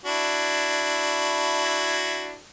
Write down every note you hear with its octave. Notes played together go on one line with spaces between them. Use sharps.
D4 E4 F#4